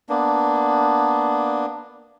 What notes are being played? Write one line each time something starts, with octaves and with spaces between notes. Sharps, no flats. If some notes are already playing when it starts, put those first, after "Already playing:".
A#3 B3 D4